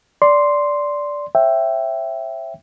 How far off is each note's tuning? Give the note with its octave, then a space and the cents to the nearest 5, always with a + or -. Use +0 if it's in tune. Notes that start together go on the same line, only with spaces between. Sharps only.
D5 -10 C6 +0
C#5 -35 E5 +5 G5 +0